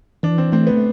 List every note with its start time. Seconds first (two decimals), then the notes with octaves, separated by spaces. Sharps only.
0.23 E3 D4
0.38 C4
0.52 A3 C4
0.67 B3